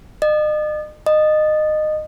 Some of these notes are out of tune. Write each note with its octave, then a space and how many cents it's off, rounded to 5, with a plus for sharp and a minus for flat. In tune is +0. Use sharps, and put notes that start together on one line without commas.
D#5 -40
D#5 -20